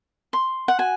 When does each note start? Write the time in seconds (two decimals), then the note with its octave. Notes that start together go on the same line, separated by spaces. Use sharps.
0.33 C6
0.68 F#5
0.79 F#4 G#5